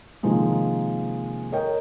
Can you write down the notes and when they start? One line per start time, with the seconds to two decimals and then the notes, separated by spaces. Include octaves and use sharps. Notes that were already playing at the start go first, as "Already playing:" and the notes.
0.23 C3 D#3 F3 G#3 A#3
1.52 A#4 C#5 D#5 G5